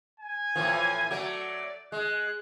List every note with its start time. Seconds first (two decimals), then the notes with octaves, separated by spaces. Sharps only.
0.20 G#5
0.56 A2 E3 F3
1.11 F#3 A3 D5
1.92 G#3 F#6